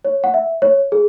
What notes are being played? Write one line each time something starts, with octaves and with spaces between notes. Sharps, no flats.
C#5
F#5
E5
C#5
G#4